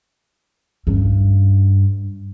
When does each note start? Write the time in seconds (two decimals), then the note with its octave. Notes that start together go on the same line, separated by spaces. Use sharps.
0.87 G2 C#4